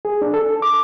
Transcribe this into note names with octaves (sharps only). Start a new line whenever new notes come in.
G#4
D4
A4
D6